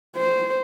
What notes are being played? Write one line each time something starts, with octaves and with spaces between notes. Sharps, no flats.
C5